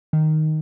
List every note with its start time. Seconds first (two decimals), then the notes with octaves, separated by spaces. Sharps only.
0.13 D#3